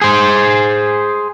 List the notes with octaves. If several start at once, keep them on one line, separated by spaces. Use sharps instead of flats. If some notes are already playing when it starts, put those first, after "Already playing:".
G#4 C5